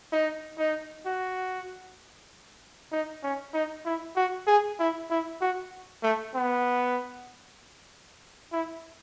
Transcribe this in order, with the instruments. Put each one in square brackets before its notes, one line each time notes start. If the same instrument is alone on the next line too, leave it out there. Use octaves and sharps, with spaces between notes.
[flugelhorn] D#4
D#4
F#4
D#4
C#4
D#4
E4
F#4
G#4
E4
E4
F#4
A3
B3
E4